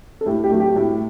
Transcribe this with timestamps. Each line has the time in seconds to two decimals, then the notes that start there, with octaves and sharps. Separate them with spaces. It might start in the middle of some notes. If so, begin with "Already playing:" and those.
0.21 A4
0.26 A2 G4
0.44 G4
0.51 F#3 A3
0.60 G4
0.76 A2